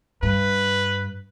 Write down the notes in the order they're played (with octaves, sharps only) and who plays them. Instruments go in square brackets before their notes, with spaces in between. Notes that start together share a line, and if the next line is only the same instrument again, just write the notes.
[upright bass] G2 [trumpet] B4